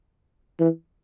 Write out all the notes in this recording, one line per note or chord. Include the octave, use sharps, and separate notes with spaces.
E3